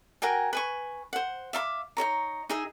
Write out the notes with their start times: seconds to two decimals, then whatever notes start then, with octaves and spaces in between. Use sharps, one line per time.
0.22 F#4 A#4 G5 G#5
0.53 B4 G#5 C#6
1.13 C5 F#5
1.53 E5 F5 C6 D6
1.97 D#4 A4 C#5 A#5
2.49 D#4 G#4 E5